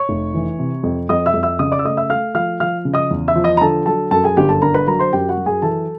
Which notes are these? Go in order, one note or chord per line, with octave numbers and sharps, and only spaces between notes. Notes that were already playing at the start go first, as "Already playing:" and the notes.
Already playing: C#5 C#6
F1
E3
C3
F2
F2 D#5 D#6
E5 E6
F2
E5 E6
C#3 D#5 D#6
D5 D6
E6
A3 D#5 D#6
E5 E6
A3 F5 F6
F3 F5 F6
F3 F5 F6
C#3
D#5 D#6
E2
E5 E6
F3
D#5 D#6
A#5
D3 A4 A5
F#3 A4 A5
F#2 A4 A5
G#4 G#5
G1 G4 G5
A4 A5
D3 A#4 A#5
B4 B5
F#3 A#4 A#5
C5 C6
F#2 G4 G5
F#4 F#5
F#3
G#4 G#5
E3 A4 A5